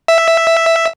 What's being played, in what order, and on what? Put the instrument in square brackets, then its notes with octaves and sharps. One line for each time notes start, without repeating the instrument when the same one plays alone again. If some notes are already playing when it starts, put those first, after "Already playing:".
[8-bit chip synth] E5